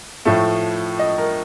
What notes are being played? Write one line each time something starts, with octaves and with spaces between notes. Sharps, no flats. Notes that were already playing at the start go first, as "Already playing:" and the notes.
A2 F3 A3
D#5
A#4